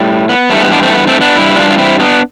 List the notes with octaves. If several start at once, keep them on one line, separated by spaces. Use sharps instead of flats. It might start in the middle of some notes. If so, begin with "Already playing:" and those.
Already playing: A2 G3
B3
G2 E3 G3 A3
B3
B3 D4
A3 C4
B3
A3 C4
B3 D4
G2 E3 G3 E4
D4 F4
F4
C4 E4
B3 D4